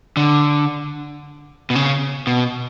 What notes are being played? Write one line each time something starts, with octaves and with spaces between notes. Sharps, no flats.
D3
B2
C#3
B2